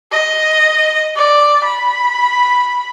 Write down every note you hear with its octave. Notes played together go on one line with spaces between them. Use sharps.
D#5
D5
B5